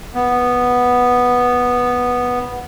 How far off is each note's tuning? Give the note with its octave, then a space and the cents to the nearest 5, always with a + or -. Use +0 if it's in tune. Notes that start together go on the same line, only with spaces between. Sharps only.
B3 -5